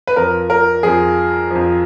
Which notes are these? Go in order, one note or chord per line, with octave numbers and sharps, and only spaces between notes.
B4
F2 F3 A#4
A#4
F2 F3 G#4
F2 F3